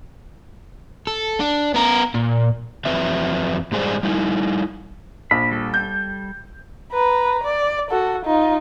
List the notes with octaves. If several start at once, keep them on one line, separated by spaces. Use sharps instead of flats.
A4
D4
B3 A#4
A#2
F2 E3 F#3 C4 B4 E5
G#2 G3 G#3 G#4 C5 D5
G3 D#4 E4
A#1 B5
G3 A4
G6
B4 A#5
D5
F#4 A4
D#4 F4